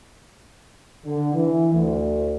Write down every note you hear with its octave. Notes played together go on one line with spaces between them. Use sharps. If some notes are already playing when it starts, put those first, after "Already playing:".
D3
E3
D2